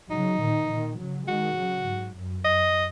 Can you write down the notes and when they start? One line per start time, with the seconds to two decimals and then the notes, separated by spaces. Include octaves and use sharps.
0.10 C#3 F#3 D#4
0.39 A#2 D#3
0.70 A#2 D#3
0.98 C#3 F#3
1.27 D#3 G#3 F#4
1.57 C#3 F#3
1.86 G#2
2.15 F#2
2.44 F#2 D#5